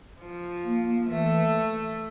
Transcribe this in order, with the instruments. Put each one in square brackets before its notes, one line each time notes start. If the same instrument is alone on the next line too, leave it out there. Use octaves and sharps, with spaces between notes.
[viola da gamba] F3
[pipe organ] A#3
[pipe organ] E3 [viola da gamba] A3